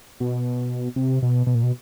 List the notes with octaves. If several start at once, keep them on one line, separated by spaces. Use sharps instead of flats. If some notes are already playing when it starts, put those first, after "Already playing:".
B2
C3
B2
B2
A#2
B2